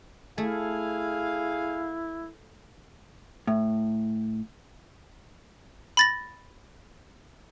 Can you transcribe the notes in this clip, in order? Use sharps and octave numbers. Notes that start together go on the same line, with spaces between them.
A3 E4 G#4 F5
A2
B5 A6 A#6